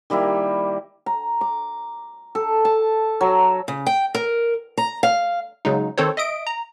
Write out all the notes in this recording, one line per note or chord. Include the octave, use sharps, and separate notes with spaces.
D#3 G3 A#3 E4
A#5
D6
A4
A5
F#3
C#3
G5
A#4
A#5
F5
C#3 F#3 G#3 D#4
D#3 C4 A4 C5 C#5
D#5 E5 D#6 D7
A#5